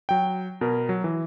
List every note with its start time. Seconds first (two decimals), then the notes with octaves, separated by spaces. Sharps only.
0.09 F#3 G5
0.61 B2 A#4
0.89 F#3
1.04 E3